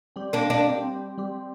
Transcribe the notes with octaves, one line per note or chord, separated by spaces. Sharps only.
G3 C4 G4
A#3 D4
A#3 D4
G3 C4 G4
G3 C4 G4